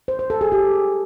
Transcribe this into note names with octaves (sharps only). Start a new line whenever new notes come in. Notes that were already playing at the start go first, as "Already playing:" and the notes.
C5
C5
A4
G#4
G4